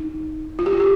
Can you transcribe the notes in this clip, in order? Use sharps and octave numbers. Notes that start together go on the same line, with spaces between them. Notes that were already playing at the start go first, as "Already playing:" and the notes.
Already playing: D#4
F4
G4
F4
G4